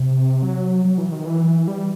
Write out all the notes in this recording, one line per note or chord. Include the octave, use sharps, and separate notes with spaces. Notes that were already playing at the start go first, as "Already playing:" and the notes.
Already playing: C3
F#3
F#3
E3
D#3
E3
G3